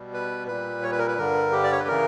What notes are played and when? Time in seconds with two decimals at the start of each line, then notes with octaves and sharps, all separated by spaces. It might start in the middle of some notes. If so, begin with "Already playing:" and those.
Already playing: B2 G3
0.13 B4
0.48 A#2 G3 B4
0.83 C#5
0.91 B4
0.99 A#4
1.07 B4
1.18 G2 D3 G3 A#4
1.52 G4
1.64 D5
1.72 C#5
1.80 B4
1.88 C#3 E3 A#4